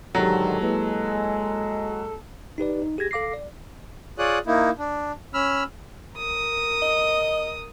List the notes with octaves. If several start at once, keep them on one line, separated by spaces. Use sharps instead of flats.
G#2 D3 D#3 F#3 G4 A4 A#5
G#3 A#3 E4 B4
D#4 G4 B4 D5
D#4
G4 G#4 G#6 A#6
A4 F5 D6 A#6 C7
D5
F4 G#4 C#5 D5 D#6 F#6
A#3 D#4 E4
D4
C#4 B5 E6 F6
A#4 D#6
D#5